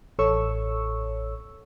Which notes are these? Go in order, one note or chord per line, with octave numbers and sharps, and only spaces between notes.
A1 A4 C#5 C#6 E6